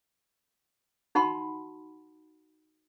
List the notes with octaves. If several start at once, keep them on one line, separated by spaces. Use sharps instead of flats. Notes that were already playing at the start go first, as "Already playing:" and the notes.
D#4 F#4 F#5 A5 B5 C6